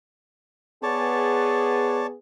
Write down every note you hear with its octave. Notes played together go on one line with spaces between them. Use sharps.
B3 G#4 C#5 D5 A5